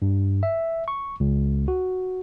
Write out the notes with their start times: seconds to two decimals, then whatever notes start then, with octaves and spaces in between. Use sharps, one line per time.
0.02 G2
0.43 E5
0.88 C#6
1.20 C#2
1.68 F#4